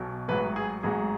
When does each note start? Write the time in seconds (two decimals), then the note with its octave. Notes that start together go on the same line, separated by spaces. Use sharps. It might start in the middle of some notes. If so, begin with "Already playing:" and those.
Already playing: B1 B2 F#3
0.28 A1 G#2 F#3 B4
0.56 G#4
0.83 A1 G#2 F#3 G#4